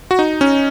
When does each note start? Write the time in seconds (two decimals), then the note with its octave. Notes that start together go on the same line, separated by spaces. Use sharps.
0.11 F#4
0.19 D#4
0.41 C#4